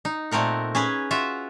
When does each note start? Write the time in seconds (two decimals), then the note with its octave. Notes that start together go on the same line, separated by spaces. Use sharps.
0.05 D#4
0.31 A#2 A3 C4 A#4 F#5
0.75 C#4 G#4 B4
1.11 F4 F#4 E5